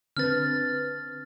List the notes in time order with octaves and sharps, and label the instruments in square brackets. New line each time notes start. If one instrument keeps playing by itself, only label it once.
[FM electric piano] D3 C4 B4 [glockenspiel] F6 A6